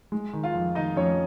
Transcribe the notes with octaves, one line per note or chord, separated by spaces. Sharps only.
G#3
D#3
F4 F5
F2
D#3 D#4 D#5
F2 C#4 C#5